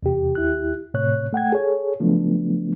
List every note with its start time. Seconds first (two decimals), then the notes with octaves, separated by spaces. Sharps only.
0.03 E2 C3 G4
0.35 D#2 E4 G4 F#6
0.94 A2 C3 C#5 F#6
1.33 A3 F#5 G5 G#6
1.52 G#4 A4 C#5
2.00 C#3 F3 F#3 A3 B3 D4